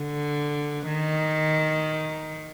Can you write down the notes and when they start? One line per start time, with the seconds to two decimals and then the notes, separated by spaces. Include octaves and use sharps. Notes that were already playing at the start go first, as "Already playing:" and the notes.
Already playing: D3
0.87 D#3